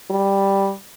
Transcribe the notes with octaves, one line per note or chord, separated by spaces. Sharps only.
G3